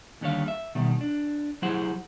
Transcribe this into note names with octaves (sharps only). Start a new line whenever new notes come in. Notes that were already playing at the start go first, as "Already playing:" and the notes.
D#2 D3 G3 C#5 F5
E5
B2 D#3 G3
D4
F#3 E4 G4 G#4 C5 F#5